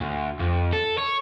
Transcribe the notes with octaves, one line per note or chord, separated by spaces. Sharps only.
D2
F2
A4
C#5